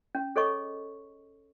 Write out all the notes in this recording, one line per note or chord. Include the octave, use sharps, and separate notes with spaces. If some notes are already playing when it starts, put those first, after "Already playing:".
C#4
G#4 A4 C#5 D#5 C#6